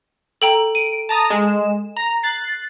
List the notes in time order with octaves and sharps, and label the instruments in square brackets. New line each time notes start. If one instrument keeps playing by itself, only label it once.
[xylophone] A4 G5 A#5
[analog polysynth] D7 [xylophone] D#7
[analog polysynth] A5 A#5 D#6
G#3 E7
A#5
F#6 A6 C7